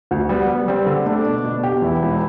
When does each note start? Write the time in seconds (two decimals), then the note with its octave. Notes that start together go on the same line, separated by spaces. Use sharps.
0.11 D2
0.29 G3 B3
0.48 G3
0.68 G3 C4
0.86 D3
1.05 A3 D4
1.26 B2
1.44 B2
1.63 G4
1.82 E2 E4
2.02 E1